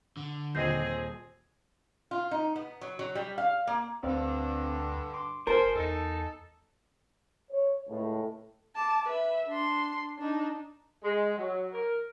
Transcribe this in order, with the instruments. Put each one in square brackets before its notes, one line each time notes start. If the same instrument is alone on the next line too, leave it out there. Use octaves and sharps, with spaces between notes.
[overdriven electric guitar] D3
[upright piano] D#1 D#5 D#7 [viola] C4 G#4 [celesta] G6 A#6 C7
[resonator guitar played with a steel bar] F4
D#4
B3
F#3
F#3
G3
F5
A#3
[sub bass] D2 [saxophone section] G2 D3 [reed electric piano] C4 D5 F5
[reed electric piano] C6 D6
[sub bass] F#1 [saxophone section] F3 C5 [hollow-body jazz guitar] A#4 [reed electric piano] G#5 A5
[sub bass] E2 [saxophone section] D#4 A4
[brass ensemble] C#5
C#2 A2
[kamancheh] A5 D6
B4 E5
D4 C6
D4 D#4
[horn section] G#3
F#3
A#4